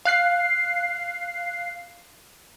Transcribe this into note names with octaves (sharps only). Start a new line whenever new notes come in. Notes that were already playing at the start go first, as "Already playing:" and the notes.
F5 F#6 C7